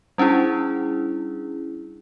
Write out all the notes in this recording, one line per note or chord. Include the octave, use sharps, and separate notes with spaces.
G3 C#4 D4 E4 G#4